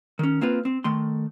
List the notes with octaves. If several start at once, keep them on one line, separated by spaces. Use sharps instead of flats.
D#3 C#4
A#3 C4 F4 B4
C4
D#3 A3 C6